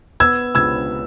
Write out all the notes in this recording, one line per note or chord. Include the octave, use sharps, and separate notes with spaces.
B3 E6 G#6
C#2 E6 G#6